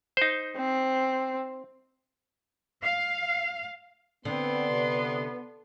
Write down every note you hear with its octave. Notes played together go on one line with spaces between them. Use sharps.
D#4 C5
C4
F5
D3 B3 C4 D5 C6
C3